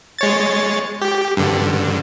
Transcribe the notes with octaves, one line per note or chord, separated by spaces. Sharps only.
G#3 C#5 A6
G4
G2 D3